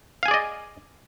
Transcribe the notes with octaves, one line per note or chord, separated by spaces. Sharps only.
G#4 D5 D#5 F5 G#5